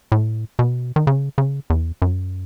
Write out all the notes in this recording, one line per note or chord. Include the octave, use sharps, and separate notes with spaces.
A2
B2
D#3
C#3
C#3
E2
F#2